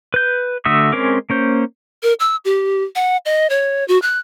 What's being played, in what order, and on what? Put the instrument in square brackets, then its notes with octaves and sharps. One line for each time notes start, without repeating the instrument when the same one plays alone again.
[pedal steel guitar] B4 G6
D3 A3 F#4 E5 D#6
G#3 C4 C#4 A#4 D6
A#3 C#4 C5
[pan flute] A#4
E6
G4
F#5
D#5
C#5
F#4
F#6